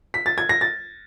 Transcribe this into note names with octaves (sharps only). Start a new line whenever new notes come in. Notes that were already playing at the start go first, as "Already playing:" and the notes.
B6
A6
G#6
A#6
A6